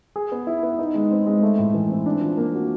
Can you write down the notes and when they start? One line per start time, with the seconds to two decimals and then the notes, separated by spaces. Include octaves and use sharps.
0.16 G#4
0.32 B3
0.47 E4
0.63 B3
0.79 D#4
0.95 G#3
1.11 C4
1.26 G#3
1.42 A3
1.59 A2
1.74 E3
1.90 C4
2.06 D4
2.21 F3
2.37 A#3
2.53 F#4